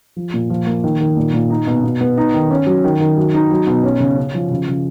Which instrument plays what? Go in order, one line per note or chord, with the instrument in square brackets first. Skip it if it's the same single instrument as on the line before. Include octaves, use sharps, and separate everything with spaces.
[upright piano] F3
A#2
F3
A#3
D#3
D#3
A#2
A#2
D#4
B2
B2
B3
D#4
D#3
C#4
F#3
D#3
D#3
F#3
D#4
F#3
B2
C#4
C#3
C#4
F3
C#3
C#3